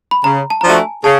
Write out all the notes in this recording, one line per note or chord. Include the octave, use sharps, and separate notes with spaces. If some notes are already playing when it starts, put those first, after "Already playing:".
B5
C#3 A#5
A5
A#5
F3 A3 D4 F#4 A5
G#5
C#3 A5